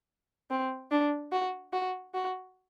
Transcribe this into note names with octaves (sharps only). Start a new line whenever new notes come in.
C4
D4
F#4
F#4
F#4